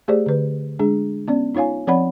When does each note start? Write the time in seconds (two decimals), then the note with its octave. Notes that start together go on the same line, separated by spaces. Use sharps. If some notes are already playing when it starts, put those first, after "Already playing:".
0.08 A3 G4 G#4 C5 D5
0.26 D3 B4
0.79 G#3 D4 G#4
1.28 B3 C#4 D5
1.55 D#4 F4 C#5 F5 G#5
1.87 F3 C4 C#5 D5 F#5 B5